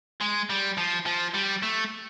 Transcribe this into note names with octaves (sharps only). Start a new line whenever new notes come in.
G#3
G3
F3
F3
G3
A3